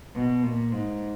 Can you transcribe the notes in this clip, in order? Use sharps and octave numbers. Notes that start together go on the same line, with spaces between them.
B2
A#2
G#2